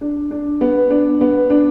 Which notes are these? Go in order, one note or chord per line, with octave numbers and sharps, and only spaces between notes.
D4
D4
B3
D4
B3
D4